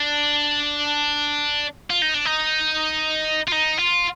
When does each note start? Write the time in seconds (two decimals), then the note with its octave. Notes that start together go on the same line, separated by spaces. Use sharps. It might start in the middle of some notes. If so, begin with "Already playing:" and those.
Already playing: D4
1.90 F4
2.02 D#4
2.14 D4
2.26 D#4
3.48 F4
3.52 D#4
3.79 F4